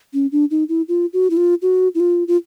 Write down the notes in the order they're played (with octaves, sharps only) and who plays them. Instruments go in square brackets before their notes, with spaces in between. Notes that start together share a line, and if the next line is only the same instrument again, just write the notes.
[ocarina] C#4
D4
D#4
E4
F4
F#4
E4
F4
F#4
E4
F4
F4